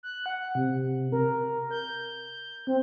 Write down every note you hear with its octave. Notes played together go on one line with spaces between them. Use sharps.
F#6
F#5
C3
A#4
G6
C4